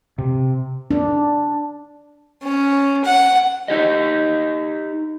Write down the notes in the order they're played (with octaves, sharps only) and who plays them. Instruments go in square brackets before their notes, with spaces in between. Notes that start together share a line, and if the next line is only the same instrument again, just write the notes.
[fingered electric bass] C3
[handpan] D4
[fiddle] C#4
F#5
[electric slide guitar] D#4 G4 D#5